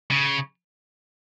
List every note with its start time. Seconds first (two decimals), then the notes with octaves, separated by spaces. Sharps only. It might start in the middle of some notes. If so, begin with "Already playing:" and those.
0.11 C#3